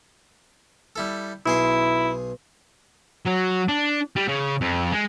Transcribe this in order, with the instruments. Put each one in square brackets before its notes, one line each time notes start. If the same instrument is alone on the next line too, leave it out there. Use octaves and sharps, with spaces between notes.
[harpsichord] G3 E4 A4
[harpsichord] B1 G#4 C6 [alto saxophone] E4
[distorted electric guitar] F#3
D4
G3
C#3
F2
G#3